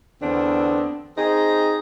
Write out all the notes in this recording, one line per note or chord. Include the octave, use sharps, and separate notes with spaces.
E2 D3 B3 C4 D4
C4 D#4 G#4